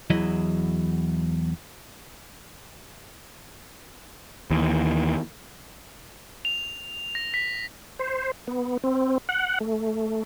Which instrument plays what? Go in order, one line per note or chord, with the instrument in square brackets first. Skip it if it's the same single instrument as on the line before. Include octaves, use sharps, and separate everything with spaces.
[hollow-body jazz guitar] E2 F#3 E4 D#5
[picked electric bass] D#2 E3
[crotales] F7
A#6
B6
[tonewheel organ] C5
B3
C4
F#5
A3